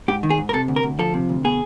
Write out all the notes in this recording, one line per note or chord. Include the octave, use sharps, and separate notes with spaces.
G#2 G4
D#3
G#4
G#2
A#4
C3 A4
D2
A#4
D2
F3 A4
C3
D2
B2 G#4